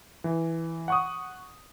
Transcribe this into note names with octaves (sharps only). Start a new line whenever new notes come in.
E3
F#5 C#6 D#6